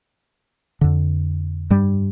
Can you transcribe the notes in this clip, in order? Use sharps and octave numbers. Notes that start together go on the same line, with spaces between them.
F2 D3
G2 G3